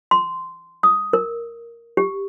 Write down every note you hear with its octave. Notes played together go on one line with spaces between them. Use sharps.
C6
D#6
A#4
G4